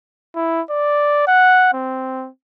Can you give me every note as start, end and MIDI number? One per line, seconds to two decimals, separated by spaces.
0.35 0.61 64
0.70 1.25 74
1.27 1.73 78
1.74 2.29 60